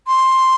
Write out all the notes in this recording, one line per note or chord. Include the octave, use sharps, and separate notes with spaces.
C6